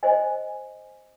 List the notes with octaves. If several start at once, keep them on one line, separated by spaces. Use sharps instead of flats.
C5 D#5 G#5